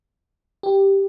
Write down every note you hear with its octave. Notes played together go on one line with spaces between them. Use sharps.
G4